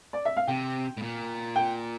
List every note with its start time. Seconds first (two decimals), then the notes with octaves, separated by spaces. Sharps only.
0.13 D5
0.25 E5
0.37 F5
0.47 C3 G5
0.97 A2
1.02 A#2
1.56 G5